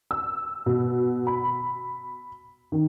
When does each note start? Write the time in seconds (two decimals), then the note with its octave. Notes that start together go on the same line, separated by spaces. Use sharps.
0.11 E6
0.66 B2
1.27 B5
2.72 D#3